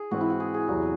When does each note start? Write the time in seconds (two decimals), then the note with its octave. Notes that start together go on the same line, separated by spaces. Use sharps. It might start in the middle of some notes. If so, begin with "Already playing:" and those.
Already playing: G#4
0.11 G#2 E3 C4 F#4
0.21 E4
0.30 F#4
0.40 G#4
0.54 G#4
0.68 E2 C3 F#3 F#4